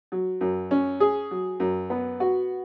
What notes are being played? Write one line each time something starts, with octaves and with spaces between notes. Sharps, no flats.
F#3
F#2
C#4
G#4
F#3
F#2
B3
F#4